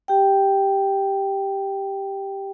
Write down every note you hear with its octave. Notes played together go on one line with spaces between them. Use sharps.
G4 G5